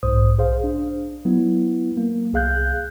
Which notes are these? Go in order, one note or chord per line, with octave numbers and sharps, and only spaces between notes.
B1 G#2 C5 D#6
B1 G#4 C5 F5
D4
F#3 B3 E4
A#3
C2 G#4 F5 F#6 G6